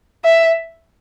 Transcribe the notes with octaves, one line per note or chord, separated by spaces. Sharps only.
E5